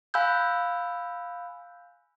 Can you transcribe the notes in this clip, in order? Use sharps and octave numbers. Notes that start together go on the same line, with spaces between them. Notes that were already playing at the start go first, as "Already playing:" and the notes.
F5 G#5 B5 E6 F#6 G6